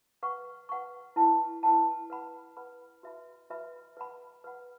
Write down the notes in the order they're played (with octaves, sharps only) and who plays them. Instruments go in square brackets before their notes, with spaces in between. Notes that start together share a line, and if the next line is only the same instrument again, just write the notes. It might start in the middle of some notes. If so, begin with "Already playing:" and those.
[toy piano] B4 F#5 C#6
B4 F#5 C#6
E4 B4 F#5 A5
E4 B4 F#5 A5
B4 F#5 B5
B4 F#5 B5
F#4 B4 E5 B5
F#4 B4 E5 B5
B4 F#5 B5
B4 F#5 B5